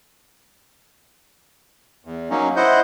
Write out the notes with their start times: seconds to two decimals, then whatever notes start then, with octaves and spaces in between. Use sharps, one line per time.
2.05 E2
2.30 F#3 A#3 C#4 D#4
2.56 E4 C5 D#5 F#5 G6